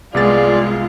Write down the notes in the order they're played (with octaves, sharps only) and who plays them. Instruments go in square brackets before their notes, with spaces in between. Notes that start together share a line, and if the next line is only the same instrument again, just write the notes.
[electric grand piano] C2 B3 A6 [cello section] G#3 F4 [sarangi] G#4 [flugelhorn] D5